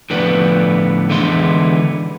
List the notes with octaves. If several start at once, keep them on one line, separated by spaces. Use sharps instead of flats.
A2 D3 F3 B3 B4 D5
D3 E3 G#3 B3 E5 C6